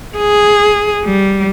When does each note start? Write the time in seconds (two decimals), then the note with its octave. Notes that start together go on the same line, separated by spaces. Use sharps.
0.18 G#4
1.04 G3